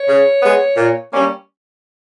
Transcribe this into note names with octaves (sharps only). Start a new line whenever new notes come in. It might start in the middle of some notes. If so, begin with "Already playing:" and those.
Already playing: C#5
C#3
G#3 B3
A#2
G3 A#3 C#4